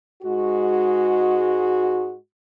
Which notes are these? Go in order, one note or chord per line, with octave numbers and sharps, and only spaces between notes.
G#2 G#3 F#4